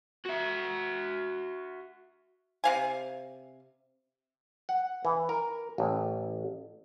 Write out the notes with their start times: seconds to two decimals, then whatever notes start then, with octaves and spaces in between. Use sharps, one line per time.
0.25 F#4 E5
2.64 C3 F5 G#5
4.69 F#5
5.05 E3
5.29 A#4
5.78 A1